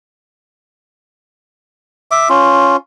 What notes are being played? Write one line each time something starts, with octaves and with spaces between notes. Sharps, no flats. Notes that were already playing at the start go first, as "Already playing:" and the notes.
E5 D6
C#4 F4